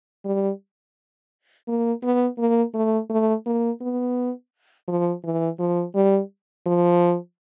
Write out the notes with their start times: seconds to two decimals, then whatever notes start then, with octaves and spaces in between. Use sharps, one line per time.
0.25 G3
1.68 A#3
2.03 B3
2.38 A#3
2.74 A3
3.10 A3
3.46 A#3
3.81 B3
4.88 F3
5.24 E3
5.59 F3
5.95 G3
6.66 F3